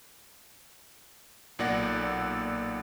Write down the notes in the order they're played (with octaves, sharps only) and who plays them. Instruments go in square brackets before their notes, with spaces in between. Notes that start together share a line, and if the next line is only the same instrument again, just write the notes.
[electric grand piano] B1 A#2 D5 F#5 A#6